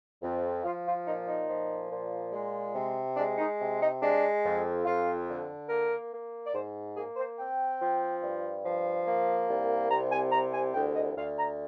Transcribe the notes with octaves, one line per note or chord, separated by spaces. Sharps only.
F2
F3 F4
F4
A#2 D#4
D#4
F3
A#2
G#3
C3
G#3 D4
D#4
C3
D#4
G#3 D4
F2
F2 F4
D3
A#3 A#4
A#3
D5
G#2 C5
A#3 G#4
C5
C4 G5
F3
G2
F3
A#3
C2
C3 A#5
G#5
C2 A#5
G#5
D2 G5
D#5
D2 F5
A#5